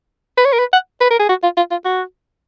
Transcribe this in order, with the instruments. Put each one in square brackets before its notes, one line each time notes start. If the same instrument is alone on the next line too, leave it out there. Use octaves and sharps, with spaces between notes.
[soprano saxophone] B4
C#5
A#4
B4
F#5
B4
A#4
G#4
F#4
F4
F4
F4
F#4